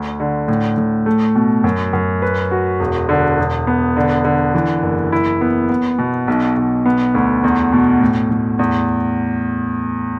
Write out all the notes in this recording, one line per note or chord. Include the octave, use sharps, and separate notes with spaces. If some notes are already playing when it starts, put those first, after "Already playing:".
Already playing: D2
D3
A2
A2
A3
B2
F#2
F#2
B4
F#4
E1
D3
E1
B3
D3
D3
E3
F#1
E4
B3
B3
B2
B1
B1
B3
D2
E2
B2
A2
A2
E2